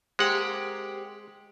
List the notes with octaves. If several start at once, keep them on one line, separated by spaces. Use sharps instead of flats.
G#3 A#3 C4 G4 F#5